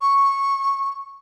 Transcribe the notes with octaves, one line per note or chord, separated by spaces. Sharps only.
C#6